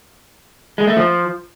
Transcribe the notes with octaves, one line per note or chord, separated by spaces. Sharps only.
G#3
A3
F3